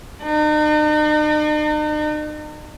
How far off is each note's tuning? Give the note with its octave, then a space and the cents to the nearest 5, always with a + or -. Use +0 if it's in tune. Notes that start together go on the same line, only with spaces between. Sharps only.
D#4 -45